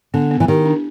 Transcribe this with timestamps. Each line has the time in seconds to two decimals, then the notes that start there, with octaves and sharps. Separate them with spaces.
0.14 D3 B3
0.31 B3
0.40 E3
0.48 D#3 G4
0.65 D4